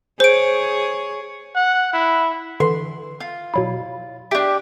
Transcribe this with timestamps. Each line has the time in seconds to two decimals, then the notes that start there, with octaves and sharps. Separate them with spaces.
0.20 G#4 C5 C#5 D7
1.55 F#5
1.93 E4
2.60 D3 E3 C6
3.20 F4
3.54 B2 F#3 E4
4.31 D4 G4 E5 G5